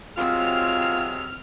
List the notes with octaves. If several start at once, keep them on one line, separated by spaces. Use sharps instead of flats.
C3 F#3 G#3 C4 F4 E6 F6